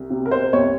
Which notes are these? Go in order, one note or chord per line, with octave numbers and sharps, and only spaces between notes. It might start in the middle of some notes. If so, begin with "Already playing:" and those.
Already playing: C2
C3
A#4
C5
C2 C#5